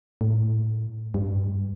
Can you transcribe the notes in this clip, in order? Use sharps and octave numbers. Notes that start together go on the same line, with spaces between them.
A2
G2